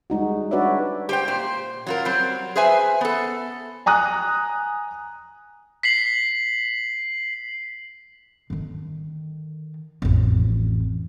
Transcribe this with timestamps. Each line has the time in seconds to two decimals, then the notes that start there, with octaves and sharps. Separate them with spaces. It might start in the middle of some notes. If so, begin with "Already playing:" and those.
0.10 G3 G#3 D#4 F#4
0.51 D4 F#4 B4 C#5 D5 E5
1.09 G4 C5 G5
1.28 A#2 C5
1.87 F#3 F4 A#4
2.05 F#3 G3 C4
2.56 G#4 B4 C5 E5 G#5
3.01 B3 A4
3.86 G#5 A#5 D#6 F#6
5.83 B6 C7 F#7
8.50 D3 D#3
10.02 A1 F2